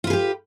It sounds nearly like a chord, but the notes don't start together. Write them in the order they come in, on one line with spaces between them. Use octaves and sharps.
F4 B4 G#4 G4